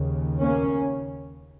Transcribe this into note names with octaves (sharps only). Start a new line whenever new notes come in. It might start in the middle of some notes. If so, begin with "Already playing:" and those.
Already playing: D#2 C#3
A#3 C#4